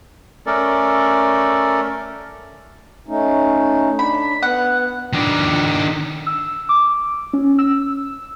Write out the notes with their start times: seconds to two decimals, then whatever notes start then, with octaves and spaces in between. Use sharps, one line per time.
0.46 A3 C#4 A4 A#4 D5
3.08 A3 C#4 D#4
3.99 D4 B5
4.43 B3 F#5
5.13 D#3 D4
6.27 E6
6.69 D6
7.33 C#4
7.58 E6